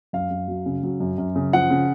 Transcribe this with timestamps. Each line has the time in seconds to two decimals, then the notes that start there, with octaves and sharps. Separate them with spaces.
0.13 F#2 F5
0.31 F#2
0.48 F#3
0.66 C#3
0.83 F#3
1.00 F#2
1.18 F#2
1.36 C#3
1.53 F3 F#5
1.70 C#3